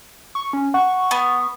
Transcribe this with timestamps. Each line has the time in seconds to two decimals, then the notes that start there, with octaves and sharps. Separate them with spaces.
0.35 C#6
0.53 C#4
0.74 F#5 C#6
1.11 B3